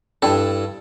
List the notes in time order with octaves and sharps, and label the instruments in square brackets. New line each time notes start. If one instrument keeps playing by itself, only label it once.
[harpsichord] G2 A4 [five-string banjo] D4 E4 G5